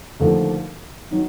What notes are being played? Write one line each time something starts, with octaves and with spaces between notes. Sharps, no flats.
D#2 D3 F3 A3
D#3 F#3